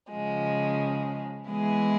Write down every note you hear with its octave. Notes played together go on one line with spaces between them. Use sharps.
C#3 F3 G#3
E3 G#3 B3 E4 G#4